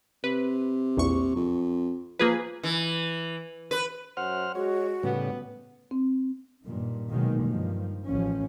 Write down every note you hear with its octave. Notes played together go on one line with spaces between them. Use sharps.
C3 B4
A#1 E2 C#6
F2
F3 A#3 G#4 B4
E3
B4
F#2 C5 F#5 F6
G#3 F#4 C#5
A2 C#3 G3 B3
C4
G2 A#2 D#3
B2 D#3 F#3 G#3 A#3
G2 D#3 F3
A1 F3 C#4